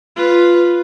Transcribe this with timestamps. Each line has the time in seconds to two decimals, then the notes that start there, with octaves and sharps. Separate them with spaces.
0.16 F4 B4